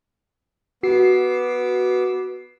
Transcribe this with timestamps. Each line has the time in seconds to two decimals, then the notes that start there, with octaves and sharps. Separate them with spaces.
0.83 B3 F#4 D6 E6 C7